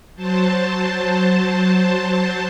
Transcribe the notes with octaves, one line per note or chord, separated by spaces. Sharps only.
F#3 C5 A5